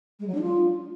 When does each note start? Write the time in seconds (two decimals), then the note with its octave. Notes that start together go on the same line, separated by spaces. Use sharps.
0.20 G#3
0.27 F#3
0.34 D4
0.42 F4